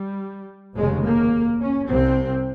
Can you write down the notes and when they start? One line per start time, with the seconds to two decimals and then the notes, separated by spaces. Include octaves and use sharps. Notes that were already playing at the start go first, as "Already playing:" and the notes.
Already playing: G3
0.76 F1 D#2 C#3 G#3
1.04 A#3
1.61 C#4
1.90 C2 C3 C4